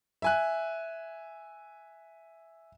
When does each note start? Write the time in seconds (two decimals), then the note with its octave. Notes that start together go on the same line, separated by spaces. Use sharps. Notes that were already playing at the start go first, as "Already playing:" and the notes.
0.22 E5 G#5 F#6